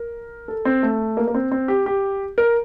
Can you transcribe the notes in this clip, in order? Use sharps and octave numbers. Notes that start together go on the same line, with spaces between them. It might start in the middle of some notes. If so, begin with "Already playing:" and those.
Already playing: A#4
A4
C4
A3
A#3
A#3
C4
C4
G4
G4
A#4